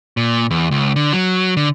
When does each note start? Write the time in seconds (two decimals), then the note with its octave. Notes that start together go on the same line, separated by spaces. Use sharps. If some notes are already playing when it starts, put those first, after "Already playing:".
0.17 A#2
0.51 E2
0.71 C#2
0.96 D3
1.13 F#3
1.57 D3